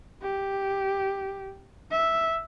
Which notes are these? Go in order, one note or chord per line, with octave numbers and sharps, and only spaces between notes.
G4
E5